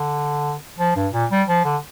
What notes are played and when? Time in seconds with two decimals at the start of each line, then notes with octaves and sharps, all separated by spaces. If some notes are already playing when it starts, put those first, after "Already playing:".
Already playing: D3
0.79 F3
0.96 G2
1.13 A#2
1.31 G3
1.48 F3
1.65 D3